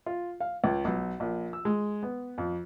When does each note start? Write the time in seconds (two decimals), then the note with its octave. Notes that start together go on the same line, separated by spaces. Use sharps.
0.06 F4
0.40 F5
0.64 C#2
0.85 B1
1.20 A#1
1.53 E6
1.65 G#3
2.03 B3
2.38 F2